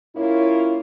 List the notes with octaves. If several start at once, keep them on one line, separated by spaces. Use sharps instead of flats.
A#2 A#3 C#4 E4 F4 C#5